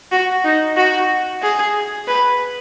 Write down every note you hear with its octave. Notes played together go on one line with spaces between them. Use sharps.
F#4
D#4
F#4
G#4
B4